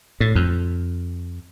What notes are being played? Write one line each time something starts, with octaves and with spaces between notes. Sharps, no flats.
A2
F2